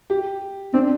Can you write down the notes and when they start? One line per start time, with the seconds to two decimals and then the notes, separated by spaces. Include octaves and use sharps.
0.10 G4
0.74 C4 D4